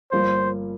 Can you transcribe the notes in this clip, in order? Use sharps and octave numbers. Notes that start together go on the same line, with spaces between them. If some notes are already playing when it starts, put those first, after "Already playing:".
G1 G2 F3 A#3 F4 C5